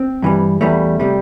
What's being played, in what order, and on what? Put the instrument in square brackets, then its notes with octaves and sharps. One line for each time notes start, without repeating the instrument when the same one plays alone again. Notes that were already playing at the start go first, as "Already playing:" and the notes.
Already playing: [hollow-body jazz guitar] C4
G2 E3 G3
E2 E3 G3 A3
C3 G3